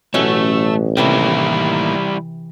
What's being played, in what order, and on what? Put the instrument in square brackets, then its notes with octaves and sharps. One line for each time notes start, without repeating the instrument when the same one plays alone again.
[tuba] A1 [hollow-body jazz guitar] B2 F#3 C#4 [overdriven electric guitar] A3 [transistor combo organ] E6
[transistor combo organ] A2 D#3 A#3 [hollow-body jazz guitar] C3 E3 E5 [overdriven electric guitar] G3 E4